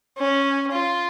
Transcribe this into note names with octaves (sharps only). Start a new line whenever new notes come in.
C#4
F4